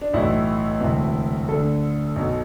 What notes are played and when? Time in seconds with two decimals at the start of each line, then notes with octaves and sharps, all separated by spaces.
0.01 D4
0.13 B1 A2 E3 E4
0.81 E1 D2 C3 E3
1.49 D2 D3 A4
2.16 B1 B2